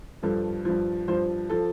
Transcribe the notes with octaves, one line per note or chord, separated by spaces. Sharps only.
G2 F3 A4
G2 F3
G2 F3 C5
F3 A4